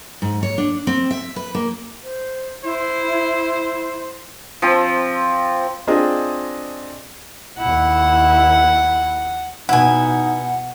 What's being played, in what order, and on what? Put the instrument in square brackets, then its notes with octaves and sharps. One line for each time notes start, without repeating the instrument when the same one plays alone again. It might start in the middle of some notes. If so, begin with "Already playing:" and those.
[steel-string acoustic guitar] G#2
C#5
D4
C4
E5
B4
A#3
[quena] C5
[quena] E4 [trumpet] C5
[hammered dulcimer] F3 C4
[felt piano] C4 D4 F4 G#4 D#5
[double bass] D#2 E4 [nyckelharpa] F#5
[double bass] B2 [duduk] D#4 [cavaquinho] E4 G#5 [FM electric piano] F#5